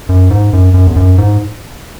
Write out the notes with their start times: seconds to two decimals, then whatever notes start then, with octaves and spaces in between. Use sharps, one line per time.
0.09 F#2
0.31 G#2
0.53 F#2
0.74 F#2
0.87 E2
0.96 F#2
1.18 G#2